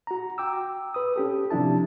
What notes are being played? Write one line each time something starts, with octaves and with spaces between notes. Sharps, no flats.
F#4 A#5
G5 D6 E6
B4 D#6
C#4 G4 A4
C3 F3 D4 E4 A5